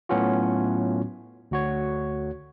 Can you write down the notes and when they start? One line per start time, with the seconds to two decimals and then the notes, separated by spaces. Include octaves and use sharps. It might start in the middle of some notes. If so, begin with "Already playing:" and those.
0.09 A2 F#3 B3 C#4 F4 F#4
1.51 D2 F#4 C#5